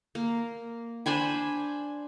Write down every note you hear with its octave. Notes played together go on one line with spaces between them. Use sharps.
A#3
D4 C5 G#5 B5